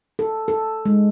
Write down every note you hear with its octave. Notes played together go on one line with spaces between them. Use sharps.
A4
A4
G#3